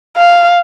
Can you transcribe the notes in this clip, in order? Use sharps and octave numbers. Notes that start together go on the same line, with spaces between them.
F5